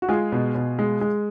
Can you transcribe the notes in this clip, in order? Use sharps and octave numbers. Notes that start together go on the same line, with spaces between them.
F#4
G#3 F4 G#4
B2
B2
G#3
G#3